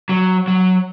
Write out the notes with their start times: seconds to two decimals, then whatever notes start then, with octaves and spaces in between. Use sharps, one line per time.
0.09 F#3
0.48 F#3